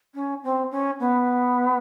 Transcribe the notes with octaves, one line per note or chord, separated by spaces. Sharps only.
C#4
C4
C#4
B3